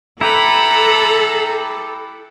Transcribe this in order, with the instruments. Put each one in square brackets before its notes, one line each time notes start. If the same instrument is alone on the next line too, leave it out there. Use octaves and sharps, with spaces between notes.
[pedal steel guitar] E4 G4 B4 [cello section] A4 [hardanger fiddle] A#5 B5